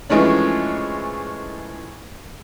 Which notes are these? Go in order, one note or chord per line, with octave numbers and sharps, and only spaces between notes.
E3 F3 G#3 A3 C#4 D4